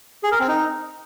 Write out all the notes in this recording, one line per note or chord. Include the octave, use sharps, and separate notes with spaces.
G#4
A#4
C4
D#4